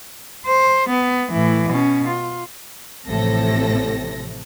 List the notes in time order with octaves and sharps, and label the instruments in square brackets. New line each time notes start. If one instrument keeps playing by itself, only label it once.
[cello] C5
B3
A2 E3
B2 C#4
F4
[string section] A1 A2 C3 F3 A4 A#6